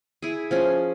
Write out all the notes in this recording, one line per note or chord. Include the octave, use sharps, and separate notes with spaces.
E4 G#4
F3 C#4 G#4